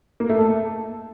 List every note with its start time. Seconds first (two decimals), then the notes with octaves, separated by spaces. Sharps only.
0.20 A#3
0.29 A3
0.39 A4